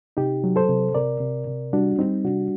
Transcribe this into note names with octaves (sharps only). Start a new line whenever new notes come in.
C3 D#4 G4
F#3
A4 C5
C3
C3 A#4 D5
C3
C3
G3 D4 F#4
G3 C4 D#4
C3 D4 F#4